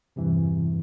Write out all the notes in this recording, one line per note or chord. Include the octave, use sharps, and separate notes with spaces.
E2 G2 C3 E3